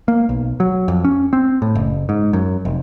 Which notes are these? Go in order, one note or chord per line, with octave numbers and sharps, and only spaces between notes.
A#3
B1
F#3
F2
C#4
C4
A2
F#1
G#2
F#2
F1